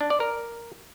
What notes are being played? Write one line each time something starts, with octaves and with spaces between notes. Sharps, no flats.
D4
D5
A#4